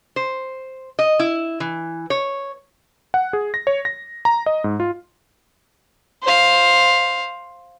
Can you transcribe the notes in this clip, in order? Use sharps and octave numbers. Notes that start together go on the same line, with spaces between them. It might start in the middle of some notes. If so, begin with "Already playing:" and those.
C5
D#5
E4
E3
C#5
F#5
G#4
A#6
C#5
A#6
A#5
D#5
G#2
F4
C5 F5